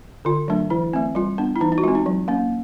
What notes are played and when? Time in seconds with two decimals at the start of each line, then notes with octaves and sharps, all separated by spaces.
0.25 D3 F4
0.48 F#3 A3 D4
0.70 E3 E4
0.93 A3 C4
1.15 G3 F4
1.38 B3 D4
1.56 E4
1.60 E3 D#4
1.72 D#4
1.78 F#4
1.83 G#3 F4
1.88 C4
1.95 D#4
2.06 F#3
2.28 A#3 C#4